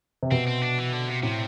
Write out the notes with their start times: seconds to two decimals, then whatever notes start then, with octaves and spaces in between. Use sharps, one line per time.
0.23 C3
0.31 B2 C4
0.47 C4
0.62 D4
0.78 E3
0.93 D3
1.07 C3
1.23 A2 C3